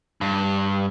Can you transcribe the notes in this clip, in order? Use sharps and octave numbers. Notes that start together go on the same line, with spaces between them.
G2